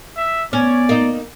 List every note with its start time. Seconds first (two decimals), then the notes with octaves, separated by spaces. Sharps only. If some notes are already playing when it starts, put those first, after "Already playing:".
0.17 E5
0.53 B3 C#4 D5
0.89 A#3 D#4